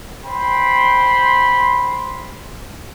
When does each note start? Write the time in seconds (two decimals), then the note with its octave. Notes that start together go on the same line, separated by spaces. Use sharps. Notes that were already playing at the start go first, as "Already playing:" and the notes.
0.25 C5 G5 B5 C6